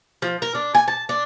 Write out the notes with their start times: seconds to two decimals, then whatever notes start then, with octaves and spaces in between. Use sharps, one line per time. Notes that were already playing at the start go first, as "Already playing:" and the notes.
0.22 F3
0.42 A#4
0.55 D4
0.75 G#5
0.88 A5
1.09 D4